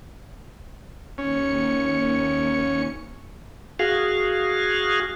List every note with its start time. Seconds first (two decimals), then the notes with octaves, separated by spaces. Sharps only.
1.18 D#2 C#4 C#7
3.79 F#4 G#4 F5